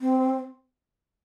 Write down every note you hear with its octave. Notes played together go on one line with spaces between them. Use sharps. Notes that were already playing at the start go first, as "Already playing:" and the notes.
C4